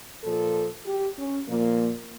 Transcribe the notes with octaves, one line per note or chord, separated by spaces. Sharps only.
A#2 F3 A4
G4
C#4
A#2 F3 A#3